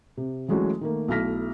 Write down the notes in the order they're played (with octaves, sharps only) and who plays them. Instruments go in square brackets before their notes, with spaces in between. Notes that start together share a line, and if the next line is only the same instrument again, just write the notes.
[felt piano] C3
E3 F#3 G#3 A3 C#4 F#4
D#3 A3 A#3
B1 A3 E4 F6 A#6 B6